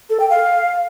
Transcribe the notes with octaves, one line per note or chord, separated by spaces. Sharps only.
A4
G5
F5